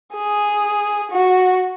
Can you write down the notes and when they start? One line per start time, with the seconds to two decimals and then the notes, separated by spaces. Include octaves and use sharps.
0.14 G#4
1.11 F#4